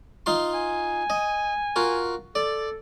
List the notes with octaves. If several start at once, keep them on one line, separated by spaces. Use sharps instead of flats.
D#4 F4 C6
G#5
D#5
F4 F#4 A#4
A4 D5